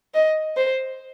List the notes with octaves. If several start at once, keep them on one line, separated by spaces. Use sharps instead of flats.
D#5
C5